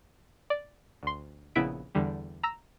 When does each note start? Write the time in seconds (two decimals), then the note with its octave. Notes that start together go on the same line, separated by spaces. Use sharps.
0.50 D5
1.03 D2 C6
1.55 A#1 C#3 B3 E4 B6 D7
1.95 E2 D3 G3
2.43 A#5 E6 A#6